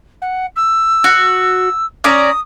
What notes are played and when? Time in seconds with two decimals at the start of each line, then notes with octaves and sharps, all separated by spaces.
0.22 F#5
0.56 E6
1.04 F#4
2.04 C#4 D5 A#5 D#6